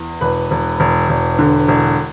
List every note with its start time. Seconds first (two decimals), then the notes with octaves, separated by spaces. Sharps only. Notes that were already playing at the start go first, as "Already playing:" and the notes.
Already playing: E2
0.21 E1 B4
0.51 E1
0.80 E1
1.09 E1
1.39 D3
1.68 E1